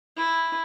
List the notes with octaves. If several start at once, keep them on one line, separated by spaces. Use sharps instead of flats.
E4